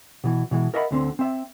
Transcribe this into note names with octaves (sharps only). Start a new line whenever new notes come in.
B2 E3
B2 E3 G#3
A#4 D#5 E5 F#5 A5 B5
D2 D3 C4
C4 E5